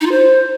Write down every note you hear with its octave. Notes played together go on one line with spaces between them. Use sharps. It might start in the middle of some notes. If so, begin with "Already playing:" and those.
D#4
F4
C5